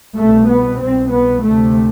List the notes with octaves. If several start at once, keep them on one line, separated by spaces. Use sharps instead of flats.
C2 B2 A3
B3
C2 B2 C4
B3
D2 C3 A3